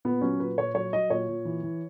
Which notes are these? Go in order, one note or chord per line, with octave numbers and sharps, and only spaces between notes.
A#2 B3
F#3 C#4
A#2 B4
A#2 C#5
F#3 C#5
F#3 D#5
A#2 C#5
A#2
E3
E3